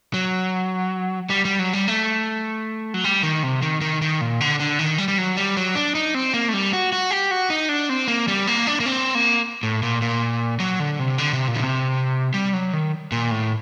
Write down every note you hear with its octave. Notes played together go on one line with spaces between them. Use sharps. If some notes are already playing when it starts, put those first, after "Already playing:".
F#3
G3
G3
F#3
G3
A3
F#3
G3
D#3
C3
D#3
D#3
D#3
A#2
D3
D3
D#3
G3
G3
F#3
G3
F#3
D4
D#4
C4
A#3
A3
G3
F#4
F#4
G4
F#4
D#4
D4
C4
A#3
G3
A#3
D4
A#3
C4
A#3
A2
A#2
A#2
F#3
D3
C3
D3
C3
A#2
D3
C3
G3
F#3
D#3
A#2
A2